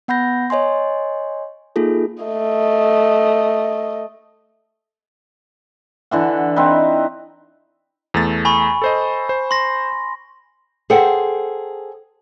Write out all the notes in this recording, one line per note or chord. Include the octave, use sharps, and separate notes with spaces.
B3 F#5 B5 G6 A#6
C#5 D#5 G#5 C6
A#3 D#4 F4 G#4 A4
A3 D#5
D3 E3 F#5
C4 D#4 B4
E2 A3 A6
G#5 B5 C#6
A4 C5 D#5
C5
C6 A#6
G#4 A4 C5 F#5 G5